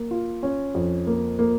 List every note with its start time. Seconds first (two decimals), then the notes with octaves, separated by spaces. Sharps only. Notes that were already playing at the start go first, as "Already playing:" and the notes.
Already playing: A#3
0.11 F4
0.43 C#4
0.75 F2
1.07 A#3
1.39 A#3